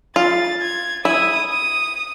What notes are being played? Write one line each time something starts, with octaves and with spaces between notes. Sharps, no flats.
F4 A6
G#6
E4 D#6
D#6